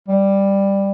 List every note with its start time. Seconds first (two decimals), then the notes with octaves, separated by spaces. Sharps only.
0.08 G3